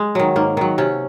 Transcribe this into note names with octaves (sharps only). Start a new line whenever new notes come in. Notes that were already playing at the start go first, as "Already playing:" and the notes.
Already playing: G#3
D#3 F#3
G#2 A#3
D#3 F#3
C3 C#4